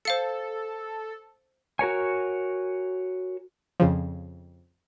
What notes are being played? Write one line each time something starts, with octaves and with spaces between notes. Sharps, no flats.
A4 C5 F5 C#7
F#4 A#4 C#5 G#5
F2 C#3 F3